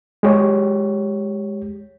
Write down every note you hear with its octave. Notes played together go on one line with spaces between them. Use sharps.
G#3 G4 C#5